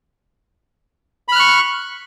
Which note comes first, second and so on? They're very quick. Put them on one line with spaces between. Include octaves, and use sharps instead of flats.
B5 F6 F#6 C#6